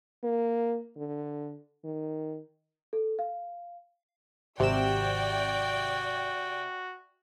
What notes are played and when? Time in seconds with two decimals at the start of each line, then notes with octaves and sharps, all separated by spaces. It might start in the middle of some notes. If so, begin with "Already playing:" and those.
0.23 A#3
0.97 D3
1.85 D#3
2.93 A4
3.19 F5
4.60 G#1 C3 F#4 D5 E5 G5 E7